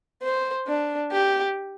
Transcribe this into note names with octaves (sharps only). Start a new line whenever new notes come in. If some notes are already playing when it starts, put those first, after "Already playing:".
C5
D4
G4